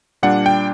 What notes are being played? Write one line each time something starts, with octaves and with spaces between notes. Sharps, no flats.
A#2 G3 D4 F#5
G5